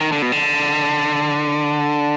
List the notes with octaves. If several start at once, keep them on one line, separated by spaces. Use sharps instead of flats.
D#3
D3
B2
D3